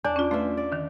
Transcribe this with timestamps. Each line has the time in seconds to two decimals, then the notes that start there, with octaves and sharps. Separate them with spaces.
0.05 E2 D4
0.16 C#4 F4
0.31 A3 F4 B4 E5
0.57 D5
0.72 D3 D#3